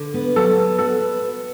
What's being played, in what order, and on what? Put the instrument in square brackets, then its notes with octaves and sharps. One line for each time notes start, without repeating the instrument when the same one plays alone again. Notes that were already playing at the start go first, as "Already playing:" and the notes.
Already playing: [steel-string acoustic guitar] D3
B3
[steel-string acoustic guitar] F#3 [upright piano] A4
[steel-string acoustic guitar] B3
[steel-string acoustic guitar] F#4 [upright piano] A4
[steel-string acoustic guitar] B3
B3